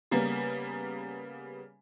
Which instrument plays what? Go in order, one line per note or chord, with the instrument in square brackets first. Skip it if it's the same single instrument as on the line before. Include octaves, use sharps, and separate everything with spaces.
[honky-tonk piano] C#3 G3 A#3 B3